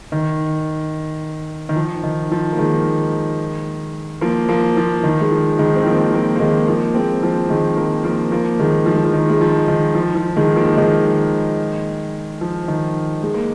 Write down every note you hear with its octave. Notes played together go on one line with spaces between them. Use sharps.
D#3
D#3
F3
D#3
F3
A#3
D#3 G#3
F3 A#3
F3 A#3
F3
D#3
G#3
F3
D#3 G#3
C4
F3 A#3
F3 A#3
A#3
D#3 G#3
F3 A#3
G#3 C4
F3 A#3
D#3 G#3
F3 A#3
F3 A#3
F3 A#3
D#3 G#3
F3
G#3
F3
D#3
G#3
F3
D#3
F3
F3
D#3 G#3
F3 A#3
D#3 G#3
F3
D#3
G#3
A#3